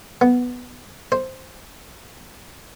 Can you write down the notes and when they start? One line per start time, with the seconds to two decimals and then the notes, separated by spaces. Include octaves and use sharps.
0.21 B3
1.12 C5